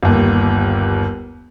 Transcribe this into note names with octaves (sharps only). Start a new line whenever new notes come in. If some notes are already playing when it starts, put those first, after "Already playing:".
G1 D#2